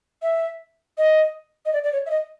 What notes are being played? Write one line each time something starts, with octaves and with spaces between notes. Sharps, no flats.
E5
D#5
D#5
D5
D5
C#5
E5
D#5